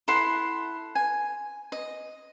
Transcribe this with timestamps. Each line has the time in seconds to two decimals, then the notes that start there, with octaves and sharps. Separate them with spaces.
0.08 E4 A4 F#5 C6
0.95 G#5
1.72 D#5